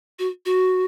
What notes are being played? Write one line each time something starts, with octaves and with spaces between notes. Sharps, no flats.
F#4
F#4